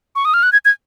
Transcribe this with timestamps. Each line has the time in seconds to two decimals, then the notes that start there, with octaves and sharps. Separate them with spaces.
0.16 C#6
0.25 D#6
0.34 F6
0.43 F#6
0.53 G#6
0.65 G#6